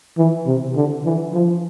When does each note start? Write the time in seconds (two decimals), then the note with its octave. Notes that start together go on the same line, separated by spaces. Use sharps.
0.18 E3
0.46 C3
0.76 D3
1.05 E3
1.33 F3